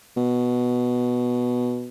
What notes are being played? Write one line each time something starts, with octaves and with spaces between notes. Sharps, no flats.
B2